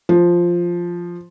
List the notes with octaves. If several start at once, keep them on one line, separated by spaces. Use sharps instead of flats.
F3